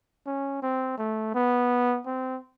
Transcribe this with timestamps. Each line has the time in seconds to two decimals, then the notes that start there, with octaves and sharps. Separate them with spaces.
0.26 C#4
0.62 C4
0.98 A3
1.34 B3
2.06 C4